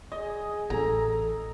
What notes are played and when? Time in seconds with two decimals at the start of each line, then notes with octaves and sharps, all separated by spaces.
0.12 G#4 D#5
0.70 A1 A4 A#5